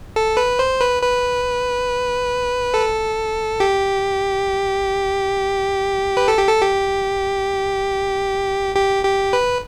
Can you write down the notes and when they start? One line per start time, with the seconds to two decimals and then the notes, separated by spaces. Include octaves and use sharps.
0.16 A4
0.37 B4
0.59 C5
0.81 B4
1.02 B4
2.74 A4
3.60 G4
6.17 B4
6.28 A4
6.38 G4
6.48 A4
6.61 G4
8.75 G4
9.04 G4
9.33 B4